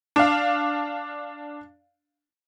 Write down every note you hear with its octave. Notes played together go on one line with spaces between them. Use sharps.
D4 F5